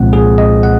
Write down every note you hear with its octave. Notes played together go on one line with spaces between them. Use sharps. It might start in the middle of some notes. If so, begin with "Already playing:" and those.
Already playing: C2 A#2 F3 G#3 C4 F#5
G#4
D#5
F#5